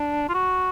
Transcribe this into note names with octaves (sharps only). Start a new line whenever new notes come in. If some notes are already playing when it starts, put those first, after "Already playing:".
Already playing: D4
F4
F#4